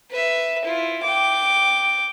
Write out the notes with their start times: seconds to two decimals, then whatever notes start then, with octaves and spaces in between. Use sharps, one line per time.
0.11 B4 E5
0.65 E4 F4
1.03 G5 D6